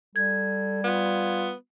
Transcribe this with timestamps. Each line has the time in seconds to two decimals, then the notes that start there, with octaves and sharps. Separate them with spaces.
0.16 G3 A4 G#6
0.84 B3 F4